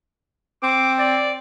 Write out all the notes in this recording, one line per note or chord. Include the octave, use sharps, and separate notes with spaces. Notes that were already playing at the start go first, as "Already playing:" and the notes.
C4 D6
D5